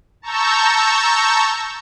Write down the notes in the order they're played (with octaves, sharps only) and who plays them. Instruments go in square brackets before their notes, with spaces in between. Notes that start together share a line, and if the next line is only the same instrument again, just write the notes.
[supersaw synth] A5 A#5 C#6 E6 G6